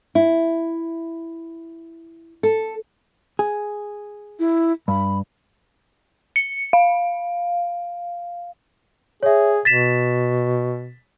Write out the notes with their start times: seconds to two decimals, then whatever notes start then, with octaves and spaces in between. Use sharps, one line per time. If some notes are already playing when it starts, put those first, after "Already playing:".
0.15 E4
2.43 A4
3.39 G#4
4.39 E4
4.88 G2 B5
6.36 C#7
6.73 F5
9.23 G#4 C#5 E5
9.65 B2 A6 B6 E7